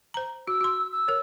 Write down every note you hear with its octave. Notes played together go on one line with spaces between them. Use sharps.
C5 A#5
F#4 E6
F#4 C6
E6
A#4 C#5